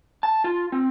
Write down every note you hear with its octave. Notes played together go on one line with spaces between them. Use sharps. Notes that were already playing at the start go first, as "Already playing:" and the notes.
A5
F4
C4